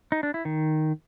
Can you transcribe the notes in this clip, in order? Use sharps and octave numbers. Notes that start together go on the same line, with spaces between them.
D#4
D4
E4
D#3